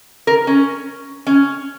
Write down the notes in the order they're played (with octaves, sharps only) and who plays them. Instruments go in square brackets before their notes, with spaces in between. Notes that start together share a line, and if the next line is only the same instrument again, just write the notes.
[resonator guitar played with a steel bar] A#4
C#4
C#4